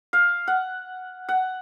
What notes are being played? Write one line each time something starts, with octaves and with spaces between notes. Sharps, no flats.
F5
F#5
F#5